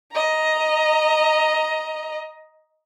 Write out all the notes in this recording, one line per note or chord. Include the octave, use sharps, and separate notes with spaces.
D#5 A#5